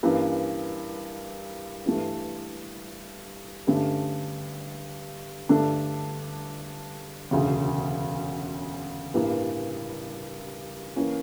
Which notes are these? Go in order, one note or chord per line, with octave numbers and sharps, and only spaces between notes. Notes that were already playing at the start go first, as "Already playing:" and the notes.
G2 E3 A#3 C#4
G2 E3 A3
G2 D3 A3 C#4
G2 D3 A3 D4 A4
E1 D2 C#3
A1 G2 E3 A#3
E3 A#3 C#4